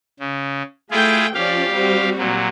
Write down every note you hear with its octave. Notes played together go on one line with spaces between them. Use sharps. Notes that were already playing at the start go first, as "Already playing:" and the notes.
C#3
A3 E4 F4 G#4 G5
F3 C#4 G4 D5 F5
G3 C4 F#4
A#2 F#3